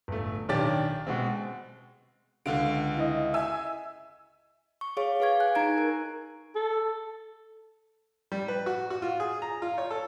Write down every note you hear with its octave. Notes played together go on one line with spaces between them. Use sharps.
G1 A3
B1 D#3 C#4 D4 G4 A6
B2 G#3 C4
C#2 D3 F5 F#5 D7
E4 D#5
E5 G#5 E6
C#6
G#4 C#5 F5 C#6
G#4 B4 F5 C#6 G#6
G#5 F#6
D#4 A#5 G#6 D7
A#4
A4
G3
B4
F#4
F#4
F4
G#4
A#5
F4
C#5
A4